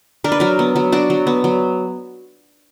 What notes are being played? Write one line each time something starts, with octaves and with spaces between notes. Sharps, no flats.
D4 A#4
B4
F#3 A#4
B3
F#3
D4 F#4
F#3
B3
F#3